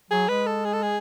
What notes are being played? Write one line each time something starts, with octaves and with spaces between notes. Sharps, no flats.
F#3 G#4
G#3 B4
A4
G#4
A4
G#4